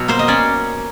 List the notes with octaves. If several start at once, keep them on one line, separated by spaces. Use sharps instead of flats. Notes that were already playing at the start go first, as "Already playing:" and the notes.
Already playing: B2 F#3
A#3 C5
D#5
C#4 D5